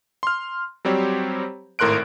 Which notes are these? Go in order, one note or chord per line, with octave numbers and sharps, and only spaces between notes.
C6 F6
F#3 G3 C4 G4 C5 C#5
G#1 A2 A#4 C6 F#6 D7